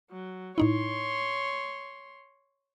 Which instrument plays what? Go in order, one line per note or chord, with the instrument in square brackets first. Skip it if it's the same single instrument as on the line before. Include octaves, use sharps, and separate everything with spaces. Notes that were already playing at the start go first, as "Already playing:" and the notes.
[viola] F#3
[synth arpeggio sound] A2 D#4 E4 [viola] C#5 C6